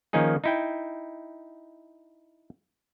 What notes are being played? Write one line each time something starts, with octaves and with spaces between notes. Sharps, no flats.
D#3 F3 A#3 C#4 D#4 G#4
D#4 E4 G5